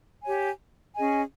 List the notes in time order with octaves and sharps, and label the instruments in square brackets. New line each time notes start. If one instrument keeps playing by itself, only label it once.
[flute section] G4 C#5 G#5
C#4 G#4 D#5 G#5